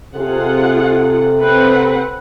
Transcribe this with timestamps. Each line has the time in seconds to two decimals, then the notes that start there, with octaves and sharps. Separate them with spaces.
0.15 C3 F4 G#4 A4 F#5
1.40 C4 B4 F#5